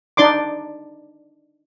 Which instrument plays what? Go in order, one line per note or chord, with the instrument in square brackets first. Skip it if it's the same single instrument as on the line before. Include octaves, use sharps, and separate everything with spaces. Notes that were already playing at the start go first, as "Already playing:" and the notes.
[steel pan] D4 D#4 D5 C6 D6